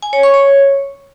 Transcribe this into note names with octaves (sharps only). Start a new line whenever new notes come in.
G#5
C#5
C#6
C#5